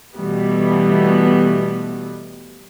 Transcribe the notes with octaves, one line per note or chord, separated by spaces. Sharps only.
B2 E3 G3 A3 B3